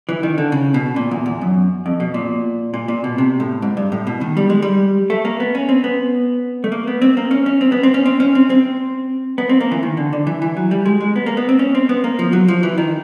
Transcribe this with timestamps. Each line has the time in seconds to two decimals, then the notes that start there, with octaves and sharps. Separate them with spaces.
0.09 E3
0.23 D#3
0.38 D3
0.52 C#3
0.74 B2
0.96 A#2
1.11 E2
1.26 E2
1.41 F#2
1.86 F2
2.00 B2
2.14 A#2
2.74 A#2
2.88 A#2
3.04 B2
3.18 C3
3.40 A2
3.62 G#2
3.77 G2
3.92 A2
4.07 B2
4.21 D#3
4.37 G3
4.50 G#3
4.62 G3
5.10 A3
5.25 A#3
5.40 B3
5.55 C#4
5.69 C4
5.84 B3
6.64 A3
6.72 A#3
6.87 B3
7.02 C4
7.17 A#3
7.31 C#4
7.46 C#4
7.61 C4
7.72 B3
7.83 C4
7.94 C#4
8.06 C4
8.20 C#4
8.35 C4
8.50 C4
9.38 B3
9.49 C4
9.60 A#3
9.71 E3
9.83 D#3
9.97 D3
10.13 D3
10.27 E3
10.42 E3
10.57 F#3
10.71 G3
10.86 G#3
11.01 G#3
11.16 B3
11.26 A#3
11.37 B3
11.49 C4
11.59 C#4
11.75 C4
11.89 B3
12.04 A#3
12.19 F3
12.33 F#3
12.48 F3
12.63 E3
12.78 D#3